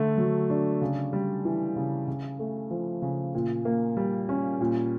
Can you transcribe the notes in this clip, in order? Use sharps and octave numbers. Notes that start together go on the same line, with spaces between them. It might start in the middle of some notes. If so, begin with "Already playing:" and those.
Already playing: D3 A3
F#3
D4
C#3
G3
E3
C#3
C#3
A3
F3
C#3
A#2
A#3
G3
C#4
A#2